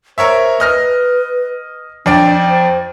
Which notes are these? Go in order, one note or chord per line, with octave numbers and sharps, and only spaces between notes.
A#4 C5 C#5 E5
B4 D#5 F6 A#6
F2 D4 D5 G5
C5